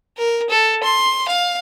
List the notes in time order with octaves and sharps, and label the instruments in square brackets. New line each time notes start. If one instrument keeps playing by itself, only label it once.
[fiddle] A#4
A4
C6
F5